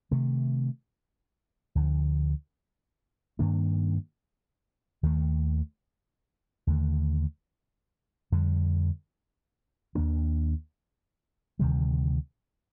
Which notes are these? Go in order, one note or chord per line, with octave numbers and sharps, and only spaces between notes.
C3 D#3 A3
D2 D3 F3
G2 D#3 A#3 D4
D#2 D#3 A3
D#2 D3 A3
F2 D3 G3
D#2 D#3 A#3 D4
D2 C3 D#3 G3